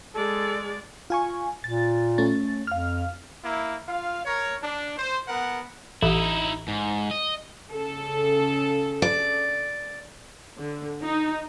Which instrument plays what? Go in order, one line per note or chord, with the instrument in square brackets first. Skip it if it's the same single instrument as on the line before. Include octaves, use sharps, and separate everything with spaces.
[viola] G#3 D5 [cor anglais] A4
[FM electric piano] F4 G#5 C#6
[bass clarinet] A#2 [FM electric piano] A6
[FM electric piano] A3 C#4 A6
[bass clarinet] F2 [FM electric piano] F5 F6
[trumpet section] A#3 E4
F4 F5
A#4 C#5
D4
C5
B3 A#4 F#5
[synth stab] A1 [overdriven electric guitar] D#4 E4
[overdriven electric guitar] G#2
D#5
[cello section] C#3 A4
[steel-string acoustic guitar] D5
[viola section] D3
D#4